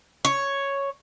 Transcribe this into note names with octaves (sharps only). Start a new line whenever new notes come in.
C#5